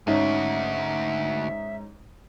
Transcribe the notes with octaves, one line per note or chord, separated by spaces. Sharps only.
D2 G#2 C#4 D#4 E5